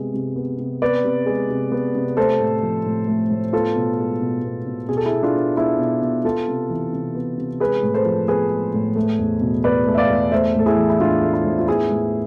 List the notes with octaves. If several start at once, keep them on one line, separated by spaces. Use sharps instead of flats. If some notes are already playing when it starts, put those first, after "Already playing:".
Already playing: C3 G#3 B3
C3
B3
C3
B3 B4 D5
C3
G#3
C3
B3
C3
A3 A4 C5
A2
F3
A2
A3
A2
B3 F4 A4
B2
G#3
B2
B3
B2
B2 G#4
A4
E4 G#4
B2
D4 F4
B3
B3 E4 G#4
B2
B2
B3 F4 A4
C3
E3
C3
B3
C3
G#3 G#4 B4
A2
A4 C5
F3
B3 G#4 B4
G#3
A2
A3
E2
B2
E2 B4 D5
A3
E5
D5 F5
E2
A3 C5 E5
A2 A4
E4 G#4
E3
E4
A2 D4 F4
A3
E4
A2
F4
B3 E4 G#4
A2